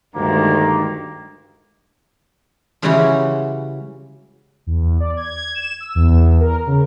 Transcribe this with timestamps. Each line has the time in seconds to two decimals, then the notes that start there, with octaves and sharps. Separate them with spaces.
0.16 D2 G2 D#3 G#3 A#3
2.82 C#3 E3 G3 G#3 C#4 F#4
4.67 E2
5.00 D5
5.17 G#6
5.54 E7
5.80 E6
5.95 E2
6.40 A#4
6.67 C#3